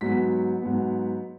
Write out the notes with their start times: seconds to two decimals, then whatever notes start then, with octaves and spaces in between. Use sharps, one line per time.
0.01 G#2 F#3 B3 B6
0.62 G#2 F#3 B3